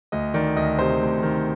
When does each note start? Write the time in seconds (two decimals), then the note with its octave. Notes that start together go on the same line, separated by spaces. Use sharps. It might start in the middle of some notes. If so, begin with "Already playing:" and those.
0.12 D2 D#5
0.34 D#3 D5
0.56 D2 D#5
0.79 C3 C5
1.01 D2
1.23 D#3